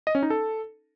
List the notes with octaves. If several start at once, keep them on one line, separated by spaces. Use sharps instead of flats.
D#5
C#4
D#4
A4